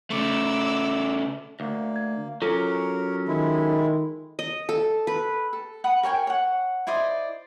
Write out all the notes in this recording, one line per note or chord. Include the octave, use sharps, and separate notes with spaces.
C#3 A3 D6 E6
D2 A#3
G#6
F#3 C#4 F4 A4 A#4
D#3 G#3 E4
D#5
A4
B4
A4
F#5 B5 D#6
A#4 C#5 G5 G#5
C#5 F#5
E4 C5 D5 D#5